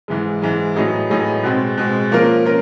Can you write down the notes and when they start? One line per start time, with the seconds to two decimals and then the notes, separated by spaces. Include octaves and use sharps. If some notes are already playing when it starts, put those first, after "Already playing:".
0.08 G#2 E3 G#3
0.42 G#2 E3 G#3
0.76 A2 F#3 B3 D#4 G#4
1.10 A2 F#3 B3 D#4 G#4
1.44 B2 G#3 C4
1.78 B2 G#3 C4
2.11 F3 A#3 C#4 F4 A#4
2.45 C#4 F4 A#4